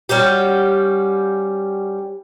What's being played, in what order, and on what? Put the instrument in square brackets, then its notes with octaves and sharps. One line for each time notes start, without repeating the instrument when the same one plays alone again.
[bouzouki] G3 C#4 F#4 G4